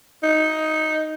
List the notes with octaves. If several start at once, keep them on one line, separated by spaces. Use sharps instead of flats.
D#4